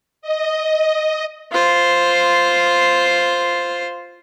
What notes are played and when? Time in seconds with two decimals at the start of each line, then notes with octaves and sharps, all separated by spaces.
0.22 D#5
1.52 F4 C5